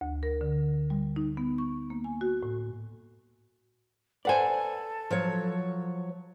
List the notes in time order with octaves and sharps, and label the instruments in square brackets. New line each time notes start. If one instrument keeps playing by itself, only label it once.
[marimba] D2
A#4
D3
G3
D#4
B3
C#6
A#3
G#5
F#4
A2
[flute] A4 [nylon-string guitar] B4 C5 [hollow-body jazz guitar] D5 F#5 G#5
[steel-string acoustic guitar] F3 F#3 C#5